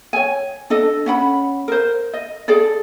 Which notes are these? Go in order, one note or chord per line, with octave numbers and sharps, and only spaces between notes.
C#5 G#5
D4 A4 D#5
C#4 F#5 B5
A#4 C5
D#5
G#4 A4 D5